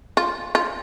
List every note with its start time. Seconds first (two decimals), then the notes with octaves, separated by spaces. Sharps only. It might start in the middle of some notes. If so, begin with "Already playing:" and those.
0.17 F4
0.55 F4